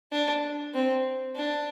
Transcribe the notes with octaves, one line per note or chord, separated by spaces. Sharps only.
D4
C4
D4